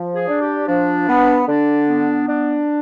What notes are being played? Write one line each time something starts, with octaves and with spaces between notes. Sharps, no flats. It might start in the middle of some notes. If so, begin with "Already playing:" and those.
Already playing: F3
G#4
D4
G4
F3 D4
B3
D3 D4
B3
D4